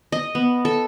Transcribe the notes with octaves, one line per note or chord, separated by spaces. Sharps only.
D#5
B3
A4